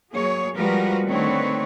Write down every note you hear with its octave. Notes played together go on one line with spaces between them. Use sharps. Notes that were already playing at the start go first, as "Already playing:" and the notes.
F#3 A#3 G#4 C#5
F3 G3 G#3 F#4 A#4 B4
D3 D#3 A3 C4 B4 C#5